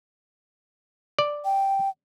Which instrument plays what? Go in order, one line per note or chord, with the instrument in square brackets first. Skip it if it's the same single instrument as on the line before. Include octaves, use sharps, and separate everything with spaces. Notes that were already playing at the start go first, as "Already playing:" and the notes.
[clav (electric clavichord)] D5
[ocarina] G5